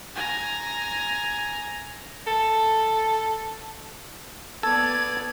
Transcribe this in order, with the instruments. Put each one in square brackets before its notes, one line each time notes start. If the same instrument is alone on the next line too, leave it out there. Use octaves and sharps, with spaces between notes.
[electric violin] G#5 A#5
[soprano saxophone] A4
[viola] B3 D5 [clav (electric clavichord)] A4 [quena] G#6